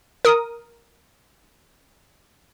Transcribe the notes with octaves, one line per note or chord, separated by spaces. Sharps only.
A#4 D#6